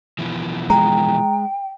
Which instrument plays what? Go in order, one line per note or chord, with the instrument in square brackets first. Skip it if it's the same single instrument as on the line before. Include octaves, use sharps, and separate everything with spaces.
[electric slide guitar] B2 E3 F3
[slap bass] G#3 [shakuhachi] G5 [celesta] A#5